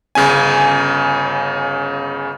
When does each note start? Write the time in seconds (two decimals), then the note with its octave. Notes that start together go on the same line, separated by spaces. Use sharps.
0.15 G1 C#3 C#4 G#5